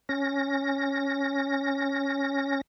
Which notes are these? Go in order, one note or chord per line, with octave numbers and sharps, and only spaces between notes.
C#4 A#6